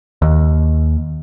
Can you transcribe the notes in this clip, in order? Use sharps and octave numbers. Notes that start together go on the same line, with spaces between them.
D#2